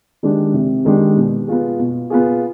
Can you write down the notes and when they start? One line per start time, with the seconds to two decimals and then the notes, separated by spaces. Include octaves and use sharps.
0.23 D#3 G#3 D4 G4
0.54 C3
0.85 D#3 G#3 D4 G4
1.17 B2
1.48 B3 F4 G#4
1.79 B2
2.10 B3 F4 G#4